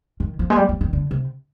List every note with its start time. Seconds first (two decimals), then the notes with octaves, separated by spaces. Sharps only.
0.20 D#3
0.39 F3
0.50 G#3
0.56 G3
0.69 F3
0.81 D#3
0.93 D3
1.11 C3